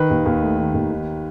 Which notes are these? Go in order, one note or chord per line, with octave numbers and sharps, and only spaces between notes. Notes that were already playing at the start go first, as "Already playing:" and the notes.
Already playing: D#3 B4
D#2
D#2
A3
D#3
D#2
D#3